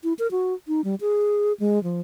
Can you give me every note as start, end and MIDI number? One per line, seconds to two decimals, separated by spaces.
0.04 0.13 64
0.19 0.30 70
0.31 0.54 66
0.68 0.81 63
0.84 0.95 55
1.01 1.53 68
1.60 1.82 56
1.83 2.01 53